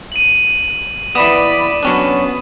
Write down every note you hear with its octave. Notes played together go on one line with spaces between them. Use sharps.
D#7 F#7
E3 B3 D5 B5 D#6 E7
F#3 B3 C#4 D4